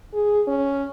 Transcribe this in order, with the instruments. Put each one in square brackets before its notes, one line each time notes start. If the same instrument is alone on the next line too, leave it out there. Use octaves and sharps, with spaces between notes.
[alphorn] G#4
C#4